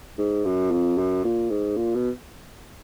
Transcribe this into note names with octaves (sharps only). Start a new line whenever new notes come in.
G#2
F#2
F2
F#2
A#2
G#2
A#2
B2